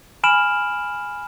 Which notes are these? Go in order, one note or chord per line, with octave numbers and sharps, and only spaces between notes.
G#5 B5 F6 D7 E7 F#7